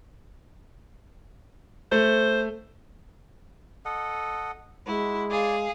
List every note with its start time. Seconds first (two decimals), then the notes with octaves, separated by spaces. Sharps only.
1.92 A3 C5
3.85 A4 D#5 F#5
4.87 G#3 E4 F#4
5.30 G#4 D5 F5 G#5